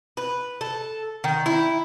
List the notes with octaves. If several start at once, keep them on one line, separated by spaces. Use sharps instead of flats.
B4
A4
D#3
E4